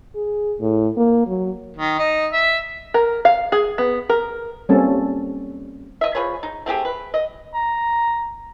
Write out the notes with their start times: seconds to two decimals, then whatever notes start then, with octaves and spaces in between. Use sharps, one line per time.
0.15 G#4
0.60 A2
0.97 A#3
1.27 F#3
1.76 D#3
1.99 D#4
2.33 E5
2.94 A#4
3.25 F5
3.52 G#4
3.78 B3
4.09 A#4
4.69 G3 A#3 C4 C#4 A4 A5
6.01 D#5 E5
6.15 F3 G#4 B4 C#5
6.43 D#4
6.66 A3 C4 G4 G#4
6.85 B4
7.14 D#5
7.55 A#5